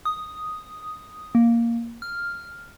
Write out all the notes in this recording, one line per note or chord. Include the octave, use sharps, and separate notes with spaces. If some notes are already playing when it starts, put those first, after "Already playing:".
D#6
A#3
F6